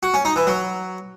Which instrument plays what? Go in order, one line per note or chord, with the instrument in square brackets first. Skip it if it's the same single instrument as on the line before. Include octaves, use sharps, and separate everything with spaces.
[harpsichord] F#4
C#4
D#4
E3
F#3